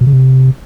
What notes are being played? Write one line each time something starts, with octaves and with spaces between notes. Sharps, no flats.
B2
C#3
C3